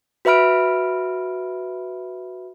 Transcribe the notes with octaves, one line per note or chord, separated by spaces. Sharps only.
F#4 B4 E5 B5 F6 D7